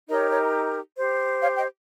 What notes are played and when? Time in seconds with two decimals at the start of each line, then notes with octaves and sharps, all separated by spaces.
0.09 D#4 G4 A#4 C#5 D#5
0.31 C#5
0.97 G4 C5
1.41 C#5 F5
1.56 D#5 G5